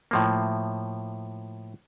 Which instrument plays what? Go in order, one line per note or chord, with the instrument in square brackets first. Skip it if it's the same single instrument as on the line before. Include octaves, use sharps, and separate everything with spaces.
[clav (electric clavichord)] A2 F3 A#3